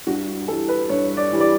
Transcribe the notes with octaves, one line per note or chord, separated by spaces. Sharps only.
G2 F#4
E3 G3 A4
B4
G2 C#5
D5
E3 G3
D5